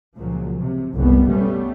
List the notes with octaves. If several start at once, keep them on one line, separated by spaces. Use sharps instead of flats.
C#2 A#2 F3 F#3
C3
F#1 C2 B2 G3 B3
B2 G3 A3 B3 C#4